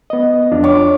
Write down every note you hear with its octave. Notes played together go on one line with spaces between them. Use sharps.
B3 D#5
F2 D4 F4
C#5 D6